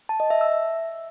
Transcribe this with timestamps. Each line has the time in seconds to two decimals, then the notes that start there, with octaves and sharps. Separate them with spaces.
0.09 A5
0.20 D#5
0.30 E5
0.41 E6
0.52 E5